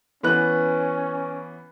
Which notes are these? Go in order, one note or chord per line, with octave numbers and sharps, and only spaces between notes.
E3 B3 C#4 F#6